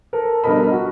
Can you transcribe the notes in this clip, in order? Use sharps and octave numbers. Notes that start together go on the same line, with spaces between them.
A4 A#4
G2 B2 A4 A#4 D#5 B5
F#4